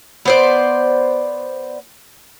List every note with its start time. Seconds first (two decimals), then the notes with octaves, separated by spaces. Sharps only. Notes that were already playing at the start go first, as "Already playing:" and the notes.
0.25 B3 C5 D5